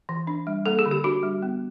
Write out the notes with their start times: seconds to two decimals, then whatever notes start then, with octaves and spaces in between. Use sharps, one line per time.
0.09 E3
0.27 D4
0.47 G3
0.66 A#3 A4
0.79 G#4
0.86 D3
0.91 G4
1.04 D4 F#4
1.23 G3
1.42 B3